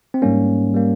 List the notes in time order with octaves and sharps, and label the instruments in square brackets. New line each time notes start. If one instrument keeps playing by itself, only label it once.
[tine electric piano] C4
G#2 G3 A#3 C#4
G3 A#3